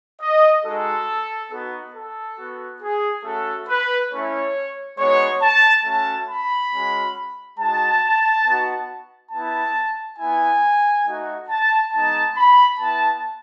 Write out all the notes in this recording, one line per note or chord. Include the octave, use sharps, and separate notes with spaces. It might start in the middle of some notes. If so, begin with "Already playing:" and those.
D#5
G#3 D#4 F#4 A4
B3 D#4 F#4
A4
B3 F#4
G#4
A3 C#4 F#4 A4
B4
A3 C#4 E4 C#5
G#3 B3 D#4 F#4 C#5
A5
A3 C#4 F#4 A5
B5
G#3 C#4 F#4
G#3 D#4 F#4 A5
B3 D#4 F#4
B3 E4 A5
B3 E4 G#5
A3 D#4 F#4
A5
G#3 B3 D#4 A5
B5
B3 E4 A5